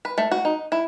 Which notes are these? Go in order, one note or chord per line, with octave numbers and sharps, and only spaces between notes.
B4
A3
F#4
D#4
E4